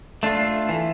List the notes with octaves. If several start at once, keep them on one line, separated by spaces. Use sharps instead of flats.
A3 D4 F4
E3